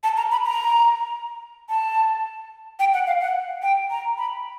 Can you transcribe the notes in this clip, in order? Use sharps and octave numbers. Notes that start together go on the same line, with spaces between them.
A5
A#5
B5
A#5
A5
G5
F#5
F5
F#5
G5
A#5
B5